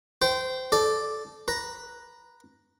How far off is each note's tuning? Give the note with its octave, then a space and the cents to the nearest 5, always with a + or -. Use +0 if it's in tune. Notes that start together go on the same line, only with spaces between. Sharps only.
C5 -20 G5 -20
A4 -20 D5 +0
B4 -5 A#5 +0